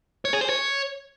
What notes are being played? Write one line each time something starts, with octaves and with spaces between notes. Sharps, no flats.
C#5
G#4
C5
C#5